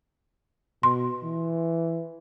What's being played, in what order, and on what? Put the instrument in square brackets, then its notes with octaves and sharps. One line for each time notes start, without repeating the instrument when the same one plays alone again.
[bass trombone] B2 [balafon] C6
[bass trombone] E3